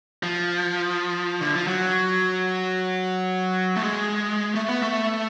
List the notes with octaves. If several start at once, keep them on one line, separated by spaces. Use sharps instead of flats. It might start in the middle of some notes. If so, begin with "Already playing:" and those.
F3
D3
F3
F#3
A3
G#3
A3
B3
A3